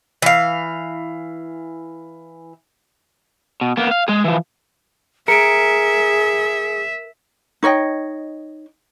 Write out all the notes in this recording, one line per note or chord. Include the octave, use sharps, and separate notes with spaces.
E3 F5
B2
A#3 B3
F5
G#3 G#4
E3 F3
G#4 A#4 E5 C#7 D7
D#4 C#5 D#5 G5